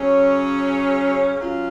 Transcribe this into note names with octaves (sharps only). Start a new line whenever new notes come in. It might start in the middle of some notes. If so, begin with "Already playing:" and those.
Already playing: C#3 F#3 C#4
F#3 C#4 F4